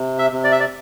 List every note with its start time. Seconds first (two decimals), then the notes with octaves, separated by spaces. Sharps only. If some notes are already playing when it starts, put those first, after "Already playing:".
Already playing: C3
0.19 E5
0.32 C3
0.44 D5
0.52 E5
0.60 D5